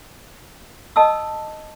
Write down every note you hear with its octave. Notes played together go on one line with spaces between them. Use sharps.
D#5 A5 D#6 E6